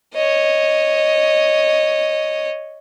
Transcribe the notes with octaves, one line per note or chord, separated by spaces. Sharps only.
C#5 D#5